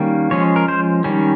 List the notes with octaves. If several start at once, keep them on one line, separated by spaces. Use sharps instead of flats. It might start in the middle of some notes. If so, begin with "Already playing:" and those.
Already playing: D#3 G3 A#3 C#4
F3 G#3 C#4 C#5
A#4
C5
D#3 G3 C#4